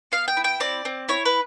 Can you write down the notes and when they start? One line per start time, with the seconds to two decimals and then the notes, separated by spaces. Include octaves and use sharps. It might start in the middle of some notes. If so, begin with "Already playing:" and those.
0.12 B3 F5
0.28 G5
0.37 E4
0.44 G5
0.60 C4 D5
0.85 C4
1.09 E4 C#5
1.25 B4